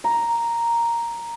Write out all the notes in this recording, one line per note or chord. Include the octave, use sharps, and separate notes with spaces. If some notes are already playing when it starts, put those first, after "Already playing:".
A#5